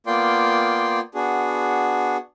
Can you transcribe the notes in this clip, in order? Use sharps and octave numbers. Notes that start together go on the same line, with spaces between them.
A#3 B3 F4 D5 G5 C6
B3 D4 F#4 G#4